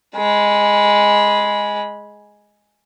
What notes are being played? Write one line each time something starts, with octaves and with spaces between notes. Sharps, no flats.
G#3 B5